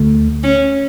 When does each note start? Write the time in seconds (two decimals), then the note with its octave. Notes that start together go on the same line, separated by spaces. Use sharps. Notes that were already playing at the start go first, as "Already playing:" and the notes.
Already playing: D2 D3 A3
0.44 C#4